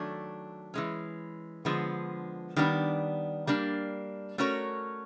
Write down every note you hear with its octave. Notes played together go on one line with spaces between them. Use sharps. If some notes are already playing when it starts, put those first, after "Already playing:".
Already playing: D#3 F#3 A3 D4
E3 G#3 C#4
D3 F3 G#3 B3
D#3 G3 B3 D4
G3 A#3 D4
A3 C#4 F#4 A#4 C#5